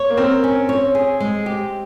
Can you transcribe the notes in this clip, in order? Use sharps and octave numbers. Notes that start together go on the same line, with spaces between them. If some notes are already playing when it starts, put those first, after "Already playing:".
Already playing: C#5
A#3
C4 A#4
C#4
C#5
G#4
G#3
G4